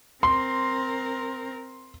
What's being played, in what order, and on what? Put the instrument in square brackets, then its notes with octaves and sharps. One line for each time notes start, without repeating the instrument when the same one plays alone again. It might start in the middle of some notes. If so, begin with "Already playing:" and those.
[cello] C4 A#4 [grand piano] C6